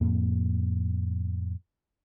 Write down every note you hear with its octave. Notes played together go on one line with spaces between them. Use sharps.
F2 A2 A#3